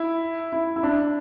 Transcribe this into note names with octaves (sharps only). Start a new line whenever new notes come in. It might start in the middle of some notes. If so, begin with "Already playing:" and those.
Already playing: E4
E4
E4
D4